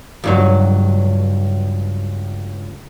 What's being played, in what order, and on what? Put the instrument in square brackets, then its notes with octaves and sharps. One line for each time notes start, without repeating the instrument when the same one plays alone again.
[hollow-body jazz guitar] C#2 G2 F#3